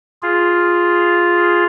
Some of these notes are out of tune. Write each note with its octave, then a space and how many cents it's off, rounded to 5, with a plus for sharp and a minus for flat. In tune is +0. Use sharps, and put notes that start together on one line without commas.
F4 +0 G#4 +0